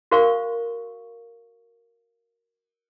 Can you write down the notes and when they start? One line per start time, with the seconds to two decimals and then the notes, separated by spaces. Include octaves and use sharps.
0.11 F#4 A#4 C5 F5 C#6